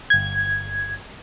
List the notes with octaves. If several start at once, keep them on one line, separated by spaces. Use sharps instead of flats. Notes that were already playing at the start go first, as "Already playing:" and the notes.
G1 G#6